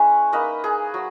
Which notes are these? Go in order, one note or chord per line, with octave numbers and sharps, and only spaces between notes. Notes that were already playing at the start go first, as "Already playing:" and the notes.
Already playing: G#3 C#4 E4 B4
A#3 D#4 B4 D#5
G#4
F#3